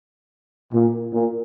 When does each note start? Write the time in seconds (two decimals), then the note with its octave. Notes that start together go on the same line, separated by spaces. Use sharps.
0.74 A#2
1.13 A#2